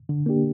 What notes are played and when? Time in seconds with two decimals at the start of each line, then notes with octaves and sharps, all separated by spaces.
0.09 D3
0.26 A#3 D4 G4